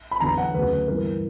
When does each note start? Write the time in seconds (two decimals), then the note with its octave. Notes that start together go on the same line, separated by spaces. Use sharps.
0.11 B5
0.20 E2 D3 F#3 B3 A#5
0.38 F#5
0.54 D2 C#3 F#3 B4
0.88 G2 E3 B3 A#4